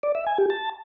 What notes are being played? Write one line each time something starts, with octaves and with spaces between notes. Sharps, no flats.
D5
E5
G#5
G4
A5